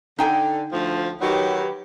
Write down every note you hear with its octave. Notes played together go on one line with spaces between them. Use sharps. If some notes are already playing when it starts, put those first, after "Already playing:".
D3 D#4 G5 G#5
D2 F3
D#3 F#3 G4 B4